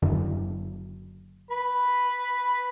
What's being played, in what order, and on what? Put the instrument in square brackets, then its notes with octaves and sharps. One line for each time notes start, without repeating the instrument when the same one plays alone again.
[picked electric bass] F#1 F#2 D3
[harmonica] B4 B5